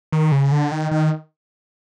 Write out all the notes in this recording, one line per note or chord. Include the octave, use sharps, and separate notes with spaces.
D#3
C#3
D3
D#3
D#3